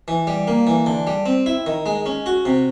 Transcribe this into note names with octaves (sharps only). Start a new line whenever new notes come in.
E3
G3
A#3
E3
D3
G3
C4
E4
D#3
G#3
C#4
F#4
C3